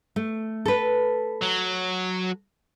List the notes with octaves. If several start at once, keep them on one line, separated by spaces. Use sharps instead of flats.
A3
A4 B4
F#3